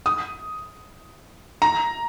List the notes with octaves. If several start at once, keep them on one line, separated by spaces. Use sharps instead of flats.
D#6
A#5